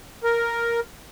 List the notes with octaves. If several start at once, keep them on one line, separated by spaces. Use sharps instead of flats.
A#4